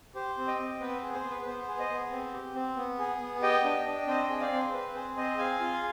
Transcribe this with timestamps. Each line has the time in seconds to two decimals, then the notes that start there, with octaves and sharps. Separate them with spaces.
0.15 G4 C5
0.38 C4
0.47 D#5 G5
0.59 C4
0.80 B3 B4
0.97 C5
1.03 G#4
1.14 C5
1.25 B3
1.30 B4
1.42 B4
1.46 B3 C5
1.62 C5
1.68 G#4
1.79 C5 D#5
1.89 B3
2.12 C4
2.33 G4
2.55 C4
2.76 B3
2.99 G#4
3.21 B3
3.42 G4 D#5 G5
3.64 D4
3.86 D4
4.07 C4 C5 D#5
4.24 D#5 G5
4.29 G#4
4.41 D5 F5
4.52 C4 C5
4.73 C4 B4
4.95 G#4 C5
5.17 C4 C5 D#5
5.38 G#4 F5 G#5
5.60 F4